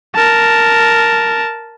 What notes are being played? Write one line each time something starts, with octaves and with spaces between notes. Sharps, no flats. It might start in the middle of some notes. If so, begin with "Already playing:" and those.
A#4 A5